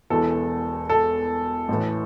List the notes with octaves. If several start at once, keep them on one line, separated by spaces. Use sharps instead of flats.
E1 E2 E3 A4
A4
A1 A2 E3